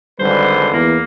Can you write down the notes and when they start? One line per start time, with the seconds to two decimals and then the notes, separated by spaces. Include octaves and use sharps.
0.19 G#1 D3 G3 B4 C5
0.73 E2 A#3